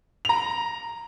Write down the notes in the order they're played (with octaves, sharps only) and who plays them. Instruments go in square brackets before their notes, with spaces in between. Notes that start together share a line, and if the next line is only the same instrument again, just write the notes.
[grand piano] A#5 F7